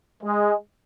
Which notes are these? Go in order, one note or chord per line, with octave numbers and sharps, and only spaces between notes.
G#3